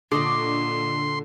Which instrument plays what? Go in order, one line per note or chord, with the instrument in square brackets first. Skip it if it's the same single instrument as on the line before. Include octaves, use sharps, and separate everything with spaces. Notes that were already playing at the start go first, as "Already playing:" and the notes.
[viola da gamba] A#2 [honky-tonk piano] D3 [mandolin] D5 D#5 C#6 [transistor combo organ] C6